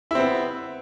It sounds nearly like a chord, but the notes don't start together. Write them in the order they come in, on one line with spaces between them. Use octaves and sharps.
E4 C4 B3